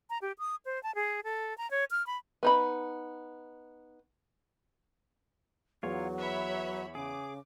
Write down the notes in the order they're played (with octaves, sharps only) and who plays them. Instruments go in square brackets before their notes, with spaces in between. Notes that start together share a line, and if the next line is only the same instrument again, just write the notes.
[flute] A#5
G4
D#6
C5
A5
G#4
A4
A#5
C#5
F6
B5
[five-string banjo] B3 D#4 B5
[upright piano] E2 [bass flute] F#3 [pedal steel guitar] F4 C#5
[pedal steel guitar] B4 [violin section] C#5 E5 B5
[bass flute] C#3 [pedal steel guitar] G#4 [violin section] D6